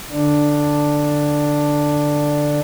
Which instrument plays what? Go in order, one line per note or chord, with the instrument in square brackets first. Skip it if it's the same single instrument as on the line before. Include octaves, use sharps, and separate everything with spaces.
[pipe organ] D3 D4